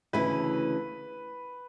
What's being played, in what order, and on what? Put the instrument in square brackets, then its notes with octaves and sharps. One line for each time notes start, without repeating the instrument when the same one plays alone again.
[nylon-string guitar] D2 C#3 E3 A3 E4 [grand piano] B4